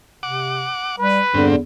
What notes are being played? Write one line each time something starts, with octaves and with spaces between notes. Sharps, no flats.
C3 F#5 D6
G3 B4
E2 G2 D3 C4